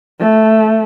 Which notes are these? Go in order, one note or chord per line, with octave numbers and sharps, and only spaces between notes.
A3